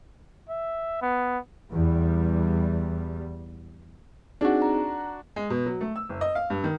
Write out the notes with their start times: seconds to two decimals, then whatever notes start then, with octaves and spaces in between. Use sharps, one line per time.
0.49 E5
1.02 B3
1.70 E2 G3
4.41 C4 D4 D#4 F#4 G#4
4.62 A#5
5.36 G#3
5.50 B2
5.66 F#3
5.81 A3
5.96 E6
6.09 F#1
6.21 D#5
6.35 F5
6.50 G2
6.64 D#3